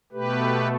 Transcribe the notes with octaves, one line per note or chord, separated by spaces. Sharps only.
B2 A3 G4 B4